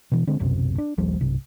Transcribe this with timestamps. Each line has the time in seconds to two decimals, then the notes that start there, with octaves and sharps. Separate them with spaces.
0.11 B2 E3
0.27 D3 G#3 C4
0.39 D1 B1 F#2 C3
0.78 D4
0.98 A#1 D#2 F3 G3
1.21 B1 G2 C3